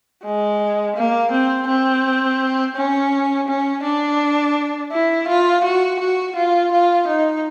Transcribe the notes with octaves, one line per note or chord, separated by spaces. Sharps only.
G#3
A#3
C4
C4
C#4
C#4
D4
E4
F4
F#4
F#4
F4
F4
D#4